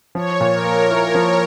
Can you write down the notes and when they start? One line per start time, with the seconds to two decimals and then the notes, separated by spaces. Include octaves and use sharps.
0.15 F3 C#5
0.40 A#2
0.52 A#4
0.65 A#3
0.90 E4
1.15 F3